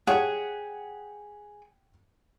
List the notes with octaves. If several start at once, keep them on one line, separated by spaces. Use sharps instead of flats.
G4 G#4 C#5 F#5